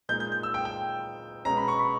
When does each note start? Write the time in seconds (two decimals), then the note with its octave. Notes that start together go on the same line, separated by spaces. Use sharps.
0.09 A#2 G#3 D#4 G6
0.20 G6
0.32 G6
0.43 E6
0.54 G5
0.65 G5
1.45 B2 G#3 C#4 A#5
1.57 B5
1.68 C#6
1.79 B5